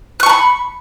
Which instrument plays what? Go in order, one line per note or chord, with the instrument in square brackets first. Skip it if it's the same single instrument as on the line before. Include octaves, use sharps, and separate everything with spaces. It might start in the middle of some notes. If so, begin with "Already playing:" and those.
[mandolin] F#6
C#6
A5
B5